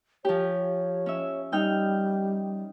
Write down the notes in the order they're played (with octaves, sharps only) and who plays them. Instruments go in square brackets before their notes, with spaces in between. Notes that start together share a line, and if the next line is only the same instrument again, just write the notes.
[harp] F3 G4 [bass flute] C#5
[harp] C#4 E5
[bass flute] G3 [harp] D#4 G5 F6